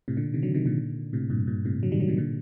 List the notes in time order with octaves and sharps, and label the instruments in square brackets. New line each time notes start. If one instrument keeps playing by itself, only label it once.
[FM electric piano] A2 C3
A#2 D3
C3 D#3
D3 F#3
C3 D#3
A#2 D3
A2 C3
G2 A#2
G2 A#2
A2 C3
D3 F#3
D#3 G3
D3 F#3
C3 D#3
A#2 D3